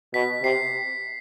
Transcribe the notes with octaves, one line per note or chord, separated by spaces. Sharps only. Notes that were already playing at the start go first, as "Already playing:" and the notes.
B2 B6
C3 C7